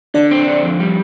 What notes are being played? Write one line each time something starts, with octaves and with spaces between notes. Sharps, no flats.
D3 D4 D5
C4
D3
F2
G3